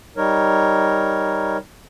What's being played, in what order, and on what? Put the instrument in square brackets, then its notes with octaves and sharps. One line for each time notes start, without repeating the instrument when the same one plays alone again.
[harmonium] G3 D#4 A#4 C#5